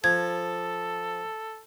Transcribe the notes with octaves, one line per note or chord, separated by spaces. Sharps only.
F3 A4 G#6